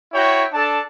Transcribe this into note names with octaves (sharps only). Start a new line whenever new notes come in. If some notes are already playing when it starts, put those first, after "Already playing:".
E4 F#4 C#5 G5
D4 A4 A5